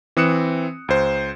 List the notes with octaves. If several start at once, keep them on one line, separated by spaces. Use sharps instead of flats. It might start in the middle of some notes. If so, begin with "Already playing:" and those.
E3 C4 D#6 F#6 C#7 E7
C#2 C5